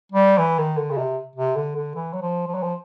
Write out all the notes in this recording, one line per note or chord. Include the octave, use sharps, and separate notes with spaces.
G3
E3
D#3
D3
C#3
C3
C3
D3
D3
E3
F#3
F3
F3
F#3
F3